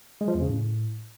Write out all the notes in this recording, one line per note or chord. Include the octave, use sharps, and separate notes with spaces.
G#3
F3
E2
C#3
A2